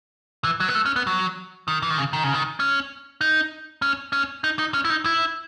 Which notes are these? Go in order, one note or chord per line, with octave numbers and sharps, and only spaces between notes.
E3
F#3
B3
A3
C#4
B3
F#3
D#3
E3
D#3
C#3
D#3
C#3
D#3
C#4
D#4
C#4
C#4
D#4
D#4
C#4
E4
D#4
E4